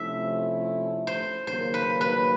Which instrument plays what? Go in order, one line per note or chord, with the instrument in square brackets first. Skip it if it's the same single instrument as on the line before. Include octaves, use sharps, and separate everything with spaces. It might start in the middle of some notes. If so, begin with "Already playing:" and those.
Already playing: [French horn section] C3 F3 A3 C#4 E4 [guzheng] E5
[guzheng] C5
[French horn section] D#2 C#3 F#3 A#3 [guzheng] C5
[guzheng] B4
B4